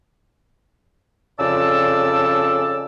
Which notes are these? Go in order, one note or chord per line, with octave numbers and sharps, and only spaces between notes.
F2 C#3 D5 A5 E6